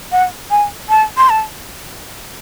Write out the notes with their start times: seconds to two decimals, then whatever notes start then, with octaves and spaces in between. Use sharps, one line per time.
0.12 F#5
0.51 G#5
0.89 A5
1.17 C6
1.30 A5